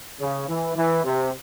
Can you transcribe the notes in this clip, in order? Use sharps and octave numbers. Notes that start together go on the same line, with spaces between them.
C#3
E3
E3
C3